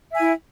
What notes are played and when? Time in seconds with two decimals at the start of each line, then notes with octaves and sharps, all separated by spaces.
0.10 E5
0.15 G#5
0.20 E4